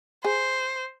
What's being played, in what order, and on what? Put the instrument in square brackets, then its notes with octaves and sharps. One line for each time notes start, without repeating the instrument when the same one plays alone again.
[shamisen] G#4 [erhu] C5